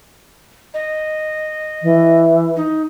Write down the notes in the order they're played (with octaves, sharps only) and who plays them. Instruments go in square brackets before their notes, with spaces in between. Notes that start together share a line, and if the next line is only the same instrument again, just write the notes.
[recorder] D#5
[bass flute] E3
[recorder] D#4